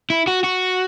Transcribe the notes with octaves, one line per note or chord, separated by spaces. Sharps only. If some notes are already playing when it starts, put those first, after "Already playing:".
E4
F#4
F#4